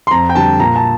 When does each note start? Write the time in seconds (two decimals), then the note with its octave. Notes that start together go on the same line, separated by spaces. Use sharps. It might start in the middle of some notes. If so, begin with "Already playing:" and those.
0.07 C6
0.11 F2 A#5
0.29 G5
0.35 D3 G3 A5
0.60 A#2 A#5
0.76 A5